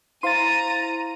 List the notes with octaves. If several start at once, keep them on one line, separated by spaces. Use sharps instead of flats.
E4 C5 F5 A#5 C6 A6 D#7